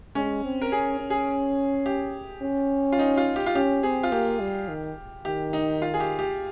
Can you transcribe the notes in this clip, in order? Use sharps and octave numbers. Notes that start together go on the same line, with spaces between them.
G#3 C#4
C4
A#4
C#4 G#4
C#4
G#4
G4
C#4
F4
D#4
F4
G4
F4
C#4 G4
C4 G#4
F4
A#3 G4
G3
D#3
D#3 G4
D#4
F4
G#4
G4
G4